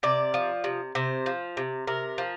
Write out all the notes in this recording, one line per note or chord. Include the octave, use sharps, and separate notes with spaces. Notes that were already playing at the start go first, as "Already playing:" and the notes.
C3 D5
F3
C3
C3 C5
F3
C3
C3 A#4
F3